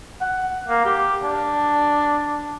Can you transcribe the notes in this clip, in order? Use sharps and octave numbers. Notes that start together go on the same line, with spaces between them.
F#5
A#3
G4
D4